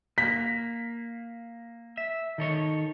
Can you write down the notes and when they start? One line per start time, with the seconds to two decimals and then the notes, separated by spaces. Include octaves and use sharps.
0.18 A#3 B6
1.97 E5
2.38 D#3 A4 C#5